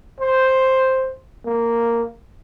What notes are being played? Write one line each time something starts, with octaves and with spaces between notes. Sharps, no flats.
C5
A#3